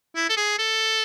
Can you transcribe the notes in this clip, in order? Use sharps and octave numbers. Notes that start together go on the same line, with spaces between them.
E4
A4
G#4
A4